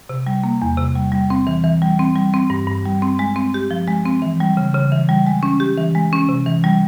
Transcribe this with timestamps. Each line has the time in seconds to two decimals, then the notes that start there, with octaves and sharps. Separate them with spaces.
0.09 C3
0.27 G3
0.43 A#3
0.62 E2
0.78 C3
0.95 G3
1.12 G3
1.30 C4
1.47 E3
1.64 E3
1.82 G3
1.99 C4
2.15 G3
2.34 C4
2.50 G2
2.67 G2
2.85 G3
3.02 C4
3.19 G#3
3.36 C4
3.54 G4
3.71 F3
3.88 G#3
4.05 C4
4.22 E3
4.40 G3
4.57 C#3
4.75 C#3
4.92 E3
5.09 G3
5.26 G#3
5.43 C#4
5.60 G4
5.78 E3
5.95 G#3
6.12 C#4
6.29 C3
6.46 E3
6.64 G3